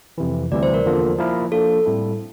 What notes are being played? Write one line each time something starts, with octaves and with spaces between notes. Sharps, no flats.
F2 C3 E3
D2 C3 E3 G3 D5
C5
A#4
E2 D3 F3 A#3 F4
F3 A#3 E4 A#4
F3 A#3 D4 A4
A2 G3 C4 E4 A4